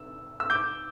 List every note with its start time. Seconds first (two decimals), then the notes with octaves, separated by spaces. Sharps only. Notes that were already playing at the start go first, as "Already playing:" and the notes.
Already playing: E6
0.40 E6
0.50 D6 G6